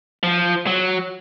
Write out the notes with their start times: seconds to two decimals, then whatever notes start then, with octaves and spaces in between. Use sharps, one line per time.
0.23 F3
0.67 F#3